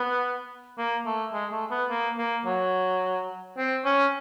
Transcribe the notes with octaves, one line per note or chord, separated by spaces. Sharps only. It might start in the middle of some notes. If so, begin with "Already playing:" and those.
Already playing: B3
A#3
A3
G#3
A3
B3
A#3
A#3
F#3
C4
C#4